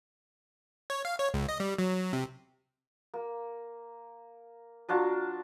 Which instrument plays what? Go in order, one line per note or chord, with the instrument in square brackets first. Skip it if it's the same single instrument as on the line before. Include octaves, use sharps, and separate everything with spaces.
[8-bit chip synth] C#5
F5
C#5
C#2
D#5
G3
F#3
C3
[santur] A#3
F#3 D4 F4 A5